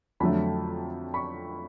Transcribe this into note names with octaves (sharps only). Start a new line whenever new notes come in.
F2 D3 F#3 A3 A5 B5
B5 C#6